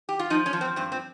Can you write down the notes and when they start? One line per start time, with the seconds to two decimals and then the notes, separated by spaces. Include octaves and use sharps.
0.09 G4
0.19 F4
0.30 F3 D#4
0.46 C#4
0.53 F3
0.61 C4
0.76 G2 C4
0.92 C4